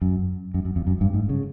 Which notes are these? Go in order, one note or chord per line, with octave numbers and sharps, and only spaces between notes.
F#2
F#2
F#2
F2
F#2
G2
G#2
C#3